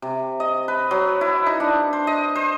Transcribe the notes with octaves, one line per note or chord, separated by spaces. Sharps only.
C3
D#5
B4
F#3
E4
D#4
D4
C5
D#5
C5